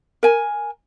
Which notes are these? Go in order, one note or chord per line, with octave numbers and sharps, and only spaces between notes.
A#4 G#5